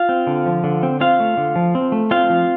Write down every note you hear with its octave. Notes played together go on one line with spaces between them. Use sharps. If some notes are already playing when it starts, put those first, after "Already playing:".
Already playing: F4 F5
C4
D3
F3
D3
C4
C4 F4 F5
A3
D3
F3
C4
A3
C4 F4 F5
F3